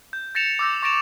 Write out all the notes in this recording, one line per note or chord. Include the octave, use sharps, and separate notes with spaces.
G6
G6 A6 A#6 C#7 E7 F7
D6 E6 G6 A#6
C#6 A6 A#6 D7 E7 F7